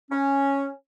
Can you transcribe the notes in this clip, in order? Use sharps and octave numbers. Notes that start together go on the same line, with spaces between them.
C#4